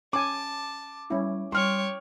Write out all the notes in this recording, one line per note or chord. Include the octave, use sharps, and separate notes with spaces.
C#4 G#5 A5 D6
G3 C#4 E4
G3 C#5 G5 C6 F6